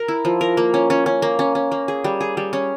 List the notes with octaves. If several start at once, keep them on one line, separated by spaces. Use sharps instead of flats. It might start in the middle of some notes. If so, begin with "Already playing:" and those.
Already playing: A#4
E4
F3
A#4
A#3
C#4
C#4
C#4
A#3
C#4
C#4
A#3
G#4
G3
G#4
G3
C#4